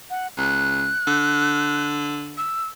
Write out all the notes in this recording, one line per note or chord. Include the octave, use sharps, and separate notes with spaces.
F#5
C#2 F#6
D3
E6